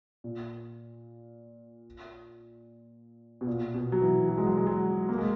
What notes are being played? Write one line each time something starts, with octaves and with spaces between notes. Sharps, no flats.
A#2
B2
A#2
B2
F#3
E3
F#3
G#3
F#3
G#3
F#3
A#3
G#3